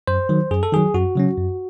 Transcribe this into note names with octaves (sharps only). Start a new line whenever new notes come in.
F#2 C5
D#3 F#3
F#2 G#4
A4
D#3 F#3 G#4
F#2 F#4
C#3 F#3 C#4
F#2